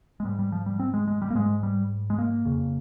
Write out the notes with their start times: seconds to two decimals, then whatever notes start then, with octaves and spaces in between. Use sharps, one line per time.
0.20 G#3
0.25 G#2 G3
0.39 G3
0.52 F3
0.66 G3
0.79 C4
0.94 G#3
1.08 G#3
1.22 G3
1.30 A#3
1.35 G#2 G#3
1.63 G3
2.10 G#3
2.18 A#3
2.45 F2 C#3